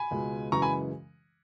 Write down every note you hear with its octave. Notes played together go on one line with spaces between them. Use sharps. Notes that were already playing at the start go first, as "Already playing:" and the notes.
Already playing: G#5 B5
C#2 B2 G#3
F#2 C#3 E3 G#3 A#5 C#6
G#5 B5